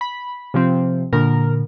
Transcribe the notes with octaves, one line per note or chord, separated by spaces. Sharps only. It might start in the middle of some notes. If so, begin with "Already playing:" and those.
B5
C3 F3 C4
A#2 D3 A#4